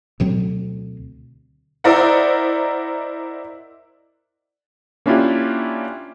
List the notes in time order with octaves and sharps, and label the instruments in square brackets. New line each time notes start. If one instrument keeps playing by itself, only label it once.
[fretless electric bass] D2 B2 F#3 C4
[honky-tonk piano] E4 A#4 C5 D5 D#5 F#5
[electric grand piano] A#3 C#4 D4 E4 F4 G4